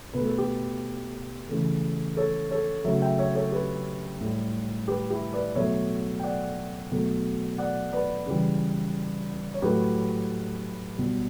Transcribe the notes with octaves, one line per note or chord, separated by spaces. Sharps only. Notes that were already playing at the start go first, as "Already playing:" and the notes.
B2 A3 B4
A4
G4 B4
C#3 E3 A3
A4 C#5
A4 C#5
C#3 F#3 A3 C#5 E5
E5 G5
C#5 E5
A4 C#5
G4 B4
A2 G3
G4 B4
E4 G4
B4 D5
B2 F#3 A3 C#5 E5
G5
D5 F#5
B2 F#3 A3
D5 F#5
B4 D5
C#3 E3 G3
C#5
A2 F#3 A3 G4 B4
B2 G3